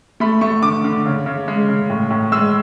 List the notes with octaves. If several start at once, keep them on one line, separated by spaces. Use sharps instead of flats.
A3 B5
A3 C#6
D3 D6
D3
C#3
C#3
G#3
C#3
A2
A2
G#3 E6